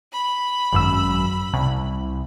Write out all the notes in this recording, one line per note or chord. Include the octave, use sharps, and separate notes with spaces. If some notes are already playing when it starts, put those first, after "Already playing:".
B5
G#1 F#2 E6
C2